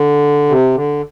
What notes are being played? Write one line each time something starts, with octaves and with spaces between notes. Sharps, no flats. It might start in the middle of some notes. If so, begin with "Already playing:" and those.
Already playing: D3
C3
D3